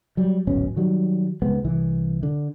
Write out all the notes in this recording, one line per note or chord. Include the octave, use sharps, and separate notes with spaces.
F#3 G3
D1 G#1 B2 C#4
D#3 F#3 G3
C#2 G#3 B3 C4
C2 E3
D3